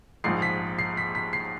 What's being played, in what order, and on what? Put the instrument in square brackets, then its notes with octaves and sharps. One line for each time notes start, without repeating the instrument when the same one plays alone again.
[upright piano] A#1 G#2 F3 C7
B6
C7
B6
B6
C7